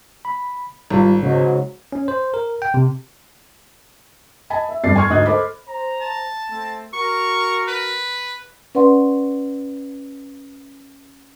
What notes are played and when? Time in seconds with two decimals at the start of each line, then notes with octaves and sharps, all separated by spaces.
0.25 B5
0.90 G#1 G3 F4
1.23 G#2 C#3 F#3
1.92 C#4
2.08 C5
2.34 A#4
2.62 G5
2.74 C3
4.50 D#5 G#5 A5 B5
4.69 E5
4.83 G1 F2 D5 A6 C7
4.96 G#5 C6 C#6 F6 G#6
5.09 D2 G#2 D#5 D#6 F#6 G#6
5.25 A4 C5 D#5 B5 D6
5.68 C5 A#5
6.01 A5
6.49 A3 C4
6.94 F#4 A#4 C#6
7.68 B4
8.75 C#4 B4 D5 F#5 C6